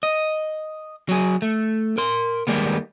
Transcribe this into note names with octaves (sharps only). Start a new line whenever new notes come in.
D#5
F#3 G#4
A3
A#4 C6
D#2 C3 G3 G#3 A#3 B3